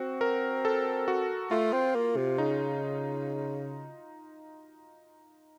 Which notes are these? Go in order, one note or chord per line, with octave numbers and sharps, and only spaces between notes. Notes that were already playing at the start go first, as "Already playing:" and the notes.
Already playing: C4 F#4
A#4
A4
F#4
A3 F4
C4
A#3
C3
C#3 D#4